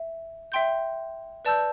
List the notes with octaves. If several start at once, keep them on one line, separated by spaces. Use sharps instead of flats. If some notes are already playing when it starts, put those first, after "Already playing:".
Already playing: E5
E5 G5 C6 G6
B4 D5 A5 E6 G6